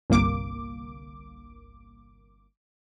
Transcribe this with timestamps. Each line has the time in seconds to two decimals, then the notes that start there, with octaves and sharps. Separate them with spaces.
0.10 G1 C2 A#3 D6